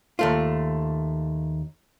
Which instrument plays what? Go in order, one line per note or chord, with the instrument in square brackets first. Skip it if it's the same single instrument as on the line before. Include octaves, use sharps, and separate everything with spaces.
[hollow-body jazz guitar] D#2 A3 F4